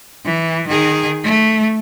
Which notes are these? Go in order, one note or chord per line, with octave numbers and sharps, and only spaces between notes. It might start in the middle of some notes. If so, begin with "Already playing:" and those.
E3
D#3 G#4
A3